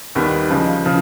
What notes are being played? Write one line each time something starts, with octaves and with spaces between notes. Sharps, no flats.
D#2 D#3 G3 B3
C#3 F3 G#3
C#3 F3